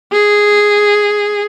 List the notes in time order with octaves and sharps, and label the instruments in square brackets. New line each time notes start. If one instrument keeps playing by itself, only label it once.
[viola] G#4